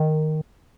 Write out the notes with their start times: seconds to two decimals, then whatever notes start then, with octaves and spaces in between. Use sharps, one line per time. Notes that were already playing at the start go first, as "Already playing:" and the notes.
Already playing: D#3